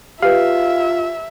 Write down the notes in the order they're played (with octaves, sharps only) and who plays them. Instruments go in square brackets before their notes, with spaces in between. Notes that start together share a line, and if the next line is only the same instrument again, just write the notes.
[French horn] F4 [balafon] G4 B4 [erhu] E5 [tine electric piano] F5